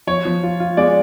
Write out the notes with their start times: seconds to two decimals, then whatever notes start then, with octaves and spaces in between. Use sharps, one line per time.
0.07 F3 C#5
0.25 F3
0.43 F4
0.60 F4
0.77 G#3 D5